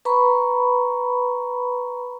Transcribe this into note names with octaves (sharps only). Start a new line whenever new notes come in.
B4 A#5 B5 C#6